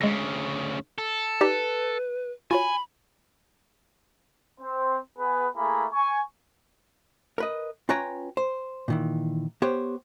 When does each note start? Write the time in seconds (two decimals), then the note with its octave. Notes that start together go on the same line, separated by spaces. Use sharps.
0.01 D2 C#3 G#3 A#6
0.98 A4
1.41 D#4 G4 B4 D5
2.51 F4 F#4 C#5 G#5 B5
4.61 C4 C5
5.19 B3 G#4 B4
5.56 A3 A#3 E4 G#4 A#5 B5
5.93 G#5 C#6
7.38 A#4 B4 D#5
7.89 C#4 F4 B4 C#5 G5 A#5
8.37 C5
8.88 A#2 D#3 E3
9.62 B3 G4 C5 C#5